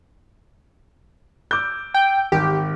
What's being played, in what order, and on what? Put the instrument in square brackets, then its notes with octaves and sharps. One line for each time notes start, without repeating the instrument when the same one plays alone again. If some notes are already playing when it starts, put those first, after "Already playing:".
[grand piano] D6 E6 G6
[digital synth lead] G5
[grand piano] G#1 [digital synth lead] G4